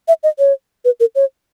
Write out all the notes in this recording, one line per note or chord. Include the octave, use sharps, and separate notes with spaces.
E5
D#5
C#5
B4
A#4
C#5